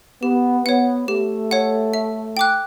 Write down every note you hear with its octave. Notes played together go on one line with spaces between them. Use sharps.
B3 G4
B3 C#5 F#5
A3 G4
C#5 F#5
E5
G5 D6 F#6